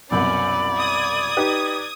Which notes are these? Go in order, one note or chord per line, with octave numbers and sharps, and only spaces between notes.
C2 F#2 B2 C#4 D5 B5
D#6 G#6
D#4 G4 B4